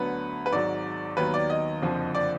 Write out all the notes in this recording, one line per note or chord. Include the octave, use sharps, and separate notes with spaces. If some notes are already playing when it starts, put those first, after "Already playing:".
Already playing: D2 D3 F#3 B3 B4
B4
G#1 G#2 F#3 D5
D#2 D#3 F#3 B3 B4
D5
D#5
F#1 F2 D3 F3
D5